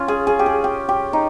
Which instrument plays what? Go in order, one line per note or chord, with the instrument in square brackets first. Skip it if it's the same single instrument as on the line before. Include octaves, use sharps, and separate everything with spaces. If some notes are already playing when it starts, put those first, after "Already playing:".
Already playing: [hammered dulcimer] C#4 F4
G#4
G#4
G4
G#4
G4
G4
D#4